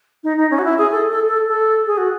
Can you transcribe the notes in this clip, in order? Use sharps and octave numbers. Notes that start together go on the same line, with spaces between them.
D#4
D#4
C#4
F#4
E4
G#4
A4
A4
A4
A4
G#4
F#4